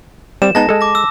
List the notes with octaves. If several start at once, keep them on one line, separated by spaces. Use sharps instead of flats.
G3 C4 E7
G#3 B3 D#4 A5 A#6
G#3 A4
D6 A#6
E6